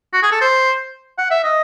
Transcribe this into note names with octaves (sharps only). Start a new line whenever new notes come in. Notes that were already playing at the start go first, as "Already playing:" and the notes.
F#4
G#4
A4
C5
F#5
E5
D#5